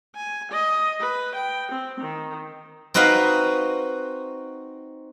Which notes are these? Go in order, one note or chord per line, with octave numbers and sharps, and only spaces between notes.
G#5
D#5
B4
G5
C4
D#3
C4 D#4 F#4 B4 D#5 F5